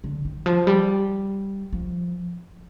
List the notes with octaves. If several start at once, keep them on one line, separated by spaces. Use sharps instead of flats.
D3
D#3
F3
G3
F3